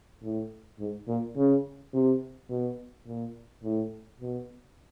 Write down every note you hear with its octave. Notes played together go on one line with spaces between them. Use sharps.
A2
G#2
A#2
C#3
C3
B2
A#2
A2
B2